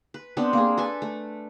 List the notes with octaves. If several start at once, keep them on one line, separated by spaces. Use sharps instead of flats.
B4
B3 C4 D4 G4
A#3 G#4
A4 B4 G#5 A5
A3